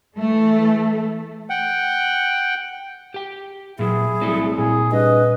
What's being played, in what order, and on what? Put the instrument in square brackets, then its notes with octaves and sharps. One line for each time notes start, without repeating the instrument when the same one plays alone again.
[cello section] E3 A3 A4
[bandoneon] F#5 G5
[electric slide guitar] G4 G5
[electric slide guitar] A#2 F#3 [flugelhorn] E4 [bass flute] G#4
[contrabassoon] C2 [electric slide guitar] F#3 A3
[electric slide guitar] A#2 [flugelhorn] G#4
[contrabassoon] G2 [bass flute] B4 [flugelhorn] D#5